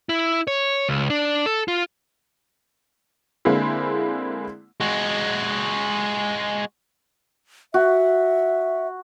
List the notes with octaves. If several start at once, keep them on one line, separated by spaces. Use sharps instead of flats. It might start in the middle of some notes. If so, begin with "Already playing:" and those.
E4
C#5
C#2
D4
A4
F4
D3 G#3 A#3 C4 E4
G#3 F#4
F#4 E5